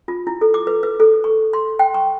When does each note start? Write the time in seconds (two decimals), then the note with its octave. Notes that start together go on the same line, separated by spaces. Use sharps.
0.08 F4
0.27 E4
0.41 A4
0.54 D6
0.67 B4
0.83 B4
1.00 A4
1.24 C#6
1.53 C6
1.79 G5
1.94 C#6